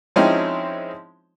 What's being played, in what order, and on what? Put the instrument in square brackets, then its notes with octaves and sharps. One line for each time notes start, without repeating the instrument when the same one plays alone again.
[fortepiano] F3 G#3 C4 C#4 D#4 E4